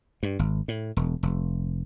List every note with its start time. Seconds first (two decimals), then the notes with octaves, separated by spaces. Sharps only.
0.23 G2
0.39 G#1
0.68 A2
0.97 E1
1.23 F1